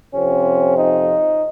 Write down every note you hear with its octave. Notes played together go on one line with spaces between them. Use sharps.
F2 C3 F3 C4 C#4
D#4